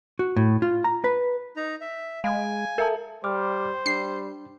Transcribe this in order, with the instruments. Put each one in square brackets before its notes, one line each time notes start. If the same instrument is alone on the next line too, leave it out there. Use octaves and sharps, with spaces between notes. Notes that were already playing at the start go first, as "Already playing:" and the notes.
[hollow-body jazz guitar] F#4
A2
F4
A#5
B4
[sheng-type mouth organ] D#4 A#5
E5
[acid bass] G#3 [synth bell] F5 [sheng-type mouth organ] G#5
[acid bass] A4 [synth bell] A#4 E5 A5
[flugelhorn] G3 [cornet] C5 [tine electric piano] D6 F6
[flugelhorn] G3 [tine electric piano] D4 [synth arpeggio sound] C7